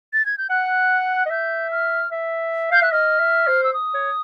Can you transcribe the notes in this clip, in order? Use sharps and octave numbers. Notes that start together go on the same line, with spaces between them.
A6
G#6
G6
F#5 F#6
D#5
E5 G6
F6
E5
F5 G6
E5 F#6
D#5 F6
E5
C5
E6
D#6
C#5